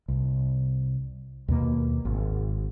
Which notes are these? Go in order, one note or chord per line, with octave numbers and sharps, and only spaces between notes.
C2
D#2 B2 A#3
G#1